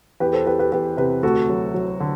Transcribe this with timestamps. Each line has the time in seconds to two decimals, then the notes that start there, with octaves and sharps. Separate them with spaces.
0.20 E2 G4 B4
0.33 A4 C5
0.46 E2 G4 B4
0.59 G4 B4
0.72 E2 G4 B4
0.97 C3 G4 B4
1.23 D2 F#4 A4
1.49 F#3
1.74 F#3
2.00 D3